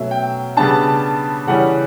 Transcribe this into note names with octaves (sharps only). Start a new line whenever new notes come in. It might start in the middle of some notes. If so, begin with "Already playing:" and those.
Already playing: B2 F#3 A3 C#4 E5
G5
C#3 G3 B3 D4 A5
C#3 E3 G3 C#4 F#5